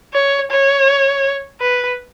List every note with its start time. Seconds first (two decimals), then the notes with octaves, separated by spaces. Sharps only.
0.14 C#5
0.51 C#5
1.60 B4